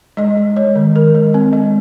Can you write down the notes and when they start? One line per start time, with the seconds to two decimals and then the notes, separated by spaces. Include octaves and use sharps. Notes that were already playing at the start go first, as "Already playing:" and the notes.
0.17 G#3 D#5
0.37 G#3
0.56 G#3 C#5
0.75 D#3
0.95 D#3 A#4
1.15 G#3
1.34 C4
1.53 G#3